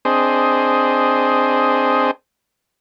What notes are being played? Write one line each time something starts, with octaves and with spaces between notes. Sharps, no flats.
C4 D4 G#4 C5 D#5